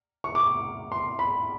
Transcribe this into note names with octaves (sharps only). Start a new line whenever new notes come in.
C#6
D6
C6
B5